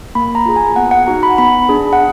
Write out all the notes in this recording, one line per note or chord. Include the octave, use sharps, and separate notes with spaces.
A#3 B5
A#5
F4 G#4
G#5
B3 F#5
F#5
D#4 F#4 A#5
B5
B3 B5
D4 G#4
F#5